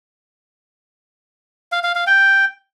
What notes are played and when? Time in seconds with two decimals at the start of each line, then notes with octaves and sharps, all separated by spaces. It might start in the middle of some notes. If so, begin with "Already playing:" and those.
1.72 F5
1.84 F5
1.95 F5
2.07 G5